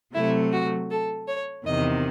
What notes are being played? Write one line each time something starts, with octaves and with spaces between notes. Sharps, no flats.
C3 F#3 A3 E4
F#4
A4
C#5
E2 C3 D#3 D#5